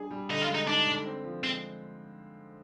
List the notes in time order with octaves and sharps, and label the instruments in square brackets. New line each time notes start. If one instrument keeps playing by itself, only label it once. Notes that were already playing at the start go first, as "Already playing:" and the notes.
Already playing: [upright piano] G3 D4 G#4
G3
[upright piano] D3 [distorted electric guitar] D#4
[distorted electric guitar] F4
[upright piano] G#3
[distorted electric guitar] D#4
[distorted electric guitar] D4 [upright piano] D#4
[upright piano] D3
C4
F3
[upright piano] G#3 [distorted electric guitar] C4